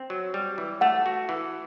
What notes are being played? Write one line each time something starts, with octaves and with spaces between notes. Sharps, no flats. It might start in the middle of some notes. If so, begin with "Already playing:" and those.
Already playing: C4
F#3
G3
E3
A3 F#5
F#4
E3